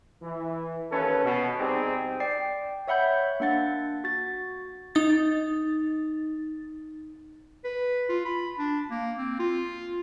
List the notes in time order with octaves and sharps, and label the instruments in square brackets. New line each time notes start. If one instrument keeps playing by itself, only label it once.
[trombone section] E3
D#2 C#4 A4 B4
B2
G3 C4 D#4 G4 G#4
[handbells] D5 G5 C7
C#5 E5 F#5 B5 G6
A#3 D4 F#5 A6
F#4 A6
[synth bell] D#4 A6
[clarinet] B4
F4
B5
D4
A#3
C4
F4